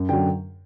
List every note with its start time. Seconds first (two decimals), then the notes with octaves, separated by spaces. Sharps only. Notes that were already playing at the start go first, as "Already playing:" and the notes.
Already playing: F#2
0.09 D3 F#3 G5